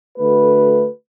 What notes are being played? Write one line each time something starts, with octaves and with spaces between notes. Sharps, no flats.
D3 A3 F#4 B4